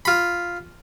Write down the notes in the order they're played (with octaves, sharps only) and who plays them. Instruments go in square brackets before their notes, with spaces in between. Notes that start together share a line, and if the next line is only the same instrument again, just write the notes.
[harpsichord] F4 B5